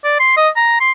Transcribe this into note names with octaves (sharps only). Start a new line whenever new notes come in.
D5
C6
D#5
A#5
C6